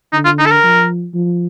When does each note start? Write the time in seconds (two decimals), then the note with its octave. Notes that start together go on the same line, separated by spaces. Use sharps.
0.13 D3 D#4
0.25 F4
0.39 D#4
0.46 A4
0.51 A#4
0.64 F3
1.14 F3